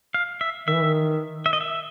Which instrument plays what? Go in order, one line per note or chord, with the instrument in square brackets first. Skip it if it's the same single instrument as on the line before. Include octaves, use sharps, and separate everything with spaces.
[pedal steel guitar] F5
E5
[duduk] D#3 [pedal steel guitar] E5
[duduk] E3
D#3
[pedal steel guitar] E5
D#5
E5